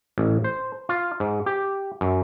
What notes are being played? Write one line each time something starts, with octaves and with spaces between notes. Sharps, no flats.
A1
C5
F4
G#2
G4
F#2